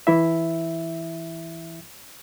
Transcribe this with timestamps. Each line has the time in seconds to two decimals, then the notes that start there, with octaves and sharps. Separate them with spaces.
0.07 E3 E4 E5